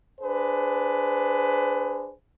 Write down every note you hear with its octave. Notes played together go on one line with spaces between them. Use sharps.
D4 G#4 B4 C5